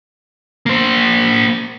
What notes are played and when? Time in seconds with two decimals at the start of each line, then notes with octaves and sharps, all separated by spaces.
0.66 A#3 C5